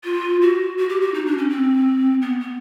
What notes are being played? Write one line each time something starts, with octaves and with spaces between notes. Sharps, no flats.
F4
F#4
F#4
G4
F#4
D#4
D4
C#4
C4
B3
B3